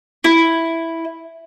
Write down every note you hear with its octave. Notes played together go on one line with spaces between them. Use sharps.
E4